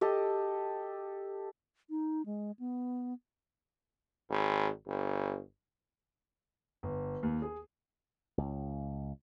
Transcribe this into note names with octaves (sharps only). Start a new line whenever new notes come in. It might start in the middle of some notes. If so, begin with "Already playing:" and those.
G4 A4 D#5
D#4
G#3
B3
G#1
G1
G1
D#2
G#4
C#2